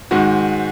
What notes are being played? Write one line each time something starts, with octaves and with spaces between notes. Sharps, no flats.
G#2 D#3 G#3 F#4